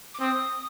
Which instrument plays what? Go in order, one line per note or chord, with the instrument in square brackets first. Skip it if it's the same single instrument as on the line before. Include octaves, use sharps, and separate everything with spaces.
[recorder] D6
[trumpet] C4 [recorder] D#6